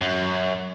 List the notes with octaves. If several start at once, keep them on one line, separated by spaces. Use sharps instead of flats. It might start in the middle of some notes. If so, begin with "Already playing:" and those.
F#2